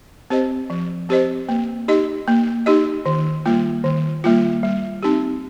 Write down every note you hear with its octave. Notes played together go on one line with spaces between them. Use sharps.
C4 G4 C5 D#5
F3
C4 G4 C5 D#5
A#3
D#4 G4 D#5
A#3
D#4 G4 D#5
D#3
G3 A#3 F4
D#3
G3 A#3 F4
G3
C4 D#4 G4